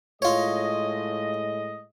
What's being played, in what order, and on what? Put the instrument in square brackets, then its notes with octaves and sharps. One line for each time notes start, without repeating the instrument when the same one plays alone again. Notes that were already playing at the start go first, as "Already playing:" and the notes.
[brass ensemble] A2 G#3 D#5 [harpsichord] F4 C#5